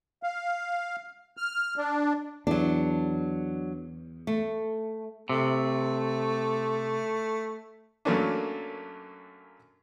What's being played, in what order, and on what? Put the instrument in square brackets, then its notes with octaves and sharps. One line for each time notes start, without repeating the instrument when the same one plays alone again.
[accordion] F5
F6
D4
[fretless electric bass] E2 [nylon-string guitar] F#3 D4
[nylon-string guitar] A3
[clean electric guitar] C3 [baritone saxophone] A3
[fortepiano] F#2 F#3 A3 A#3 C#4 D4